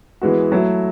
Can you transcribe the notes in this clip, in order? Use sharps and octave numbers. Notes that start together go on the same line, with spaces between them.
E3 G#3 B3 F#4
F#3 A3 E4